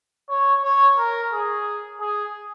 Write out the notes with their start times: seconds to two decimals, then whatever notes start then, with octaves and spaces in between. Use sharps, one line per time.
0.29 C#5
0.64 C#5
0.98 A#4
1.32 G#4
2.00 G#4